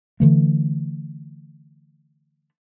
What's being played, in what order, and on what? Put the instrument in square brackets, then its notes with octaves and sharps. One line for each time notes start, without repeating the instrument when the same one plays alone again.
[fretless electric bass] D3 E3 A3